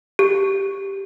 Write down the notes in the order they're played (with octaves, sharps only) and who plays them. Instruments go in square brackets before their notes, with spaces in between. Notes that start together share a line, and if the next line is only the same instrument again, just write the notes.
[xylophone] G4